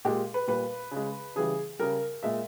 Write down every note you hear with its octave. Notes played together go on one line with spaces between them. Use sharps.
A#2 G#3 G4
B4
A#2 G3 B4
C#3 G#3
C#3 E3 G3 G#4
C#3 G3 A#4
A#2 G#3 E5